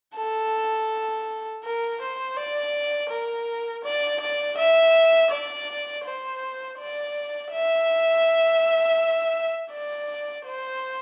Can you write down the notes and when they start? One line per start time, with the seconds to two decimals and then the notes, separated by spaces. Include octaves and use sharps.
0.16 A4
1.64 A#4
2.01 C5
2.37 D5
3.10 A#4
3.84 D5
4.21 D5
4.57 E5
5.31 D5
6.05 C5
6.79 D5
7.52 E5
9.71 D5
10.45 C5